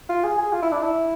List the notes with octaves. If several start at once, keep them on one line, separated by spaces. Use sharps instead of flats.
F4
G#4
G#4
F4
E4
D4
E4